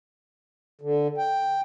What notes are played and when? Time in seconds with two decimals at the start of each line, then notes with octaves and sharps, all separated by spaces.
0.81 D3
1.18 G5